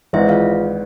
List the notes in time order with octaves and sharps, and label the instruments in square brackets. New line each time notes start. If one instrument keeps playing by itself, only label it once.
[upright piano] G#1 G#2 E3 [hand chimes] E4 E5
[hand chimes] F4 F5